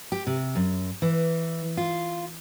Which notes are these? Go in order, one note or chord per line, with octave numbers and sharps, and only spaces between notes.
G4
C3
F#2
E3
F4